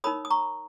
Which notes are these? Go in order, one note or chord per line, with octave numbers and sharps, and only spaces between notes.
D#4 A#4 C#5 B5 D#6
D#6
A#5 C#6